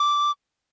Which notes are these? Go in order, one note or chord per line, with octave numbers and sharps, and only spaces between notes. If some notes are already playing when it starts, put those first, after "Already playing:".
Already playing: D6